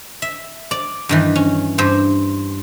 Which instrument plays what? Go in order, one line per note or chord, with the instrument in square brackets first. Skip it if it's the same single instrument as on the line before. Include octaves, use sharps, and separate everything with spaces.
[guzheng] E5
D5
G2 D#3 E3
C#4
G2 C5